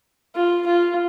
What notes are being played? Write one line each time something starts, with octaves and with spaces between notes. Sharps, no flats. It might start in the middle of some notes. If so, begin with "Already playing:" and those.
F4
F4